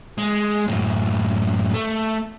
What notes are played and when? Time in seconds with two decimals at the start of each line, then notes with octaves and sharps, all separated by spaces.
0.18 G#3
0.68 F#2 A2
1.74 A3